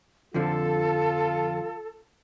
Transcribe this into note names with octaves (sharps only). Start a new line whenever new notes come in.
F2 D3 F3 F4 A4